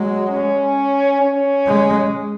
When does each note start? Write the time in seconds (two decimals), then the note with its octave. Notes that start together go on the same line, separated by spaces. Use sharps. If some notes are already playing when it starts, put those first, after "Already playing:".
Already playing: F#3 G#3
0.29 C#4
1.21 C#4
1.67 G#3